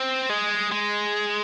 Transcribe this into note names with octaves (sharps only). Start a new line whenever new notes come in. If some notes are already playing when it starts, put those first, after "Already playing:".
Already playing: C4
G#3
G#3